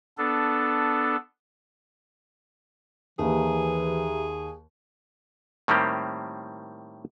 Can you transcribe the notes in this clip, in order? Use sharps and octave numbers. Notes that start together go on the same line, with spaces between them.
B3 D4 A4
D#2 E3 G4 G#4 E5 A#5
A2 D#3 G3 A#3 C4 G4